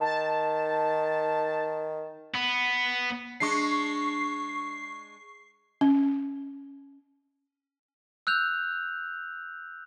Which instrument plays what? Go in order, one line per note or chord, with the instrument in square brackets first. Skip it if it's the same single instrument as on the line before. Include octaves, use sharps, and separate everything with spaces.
[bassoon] D#3 [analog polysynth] A5
[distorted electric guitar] B3
[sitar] G#3 D4 [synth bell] C#6 C7
[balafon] C#4
[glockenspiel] E6 F#6 G6 F7